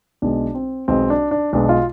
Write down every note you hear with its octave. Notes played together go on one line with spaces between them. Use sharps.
B1 B2 G#3 D4
C4
B1 B2 G#3 C4
D4
D4
B1 B2 G#3 D4
F4